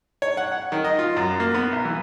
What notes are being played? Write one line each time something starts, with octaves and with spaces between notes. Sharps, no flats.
C#5
F#5
F#5
D#3
D#5
F4
F#2
A#3
B3
B1
E3